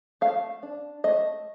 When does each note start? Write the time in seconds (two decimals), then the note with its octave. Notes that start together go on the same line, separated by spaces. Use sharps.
0.21 A3 F5
0.63 D4
1.04 A3 D#5